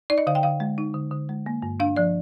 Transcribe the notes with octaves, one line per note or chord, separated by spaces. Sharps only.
D#4 D5
D#5
D3 F5
G5
D3 F5
G#3
D#4
D3
D3
G#3
A#3
G2
D4 F5
F3 D5